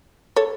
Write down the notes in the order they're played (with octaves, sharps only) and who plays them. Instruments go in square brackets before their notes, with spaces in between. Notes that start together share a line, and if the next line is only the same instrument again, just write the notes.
[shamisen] A4 C#5